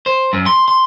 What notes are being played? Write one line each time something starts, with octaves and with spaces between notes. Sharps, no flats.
C5
F#2
C6
C6